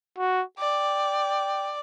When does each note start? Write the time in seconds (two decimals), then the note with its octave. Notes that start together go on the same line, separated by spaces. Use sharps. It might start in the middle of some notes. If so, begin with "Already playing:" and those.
0.18 F#4
0.59 D5 G5